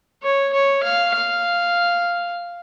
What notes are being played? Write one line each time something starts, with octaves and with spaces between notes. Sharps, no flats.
C#5
C#5
F5
F5